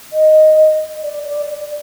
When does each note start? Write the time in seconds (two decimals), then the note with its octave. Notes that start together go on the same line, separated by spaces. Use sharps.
0.13 D#5
1.04 D5
1.26 D5
1.49 D5